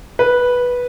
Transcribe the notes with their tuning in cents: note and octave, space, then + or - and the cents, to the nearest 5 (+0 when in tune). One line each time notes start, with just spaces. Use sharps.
B4 -10